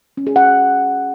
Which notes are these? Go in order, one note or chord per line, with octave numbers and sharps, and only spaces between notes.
C#4
G#4
F#5